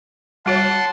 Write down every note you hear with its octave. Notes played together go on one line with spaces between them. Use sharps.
G3 F#4 C#5 F#5 A5 C6